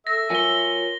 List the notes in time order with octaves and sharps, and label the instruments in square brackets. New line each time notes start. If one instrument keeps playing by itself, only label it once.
[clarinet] A4 [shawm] E5 [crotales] A#6
[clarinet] F4 [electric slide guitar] A#4 C#5 G#5 [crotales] A#6 G7